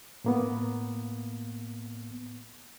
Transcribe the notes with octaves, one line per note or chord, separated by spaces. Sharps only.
A2 A#3 B3